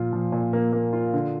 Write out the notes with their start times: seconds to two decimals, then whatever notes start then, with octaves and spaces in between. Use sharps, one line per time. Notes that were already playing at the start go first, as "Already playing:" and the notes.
Already playing: A#2 F3 F4
0.13 F3
0.32 A#2
0.53 A#3
0.73 A#3
0.93 F4
1.13 D3